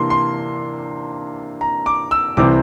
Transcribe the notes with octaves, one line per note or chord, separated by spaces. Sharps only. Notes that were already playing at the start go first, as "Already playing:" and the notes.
Already playing: C3 E3 A#3 D4 C6
C6
A#5
D6
E6
C2 C3 E3 G3 C4 D6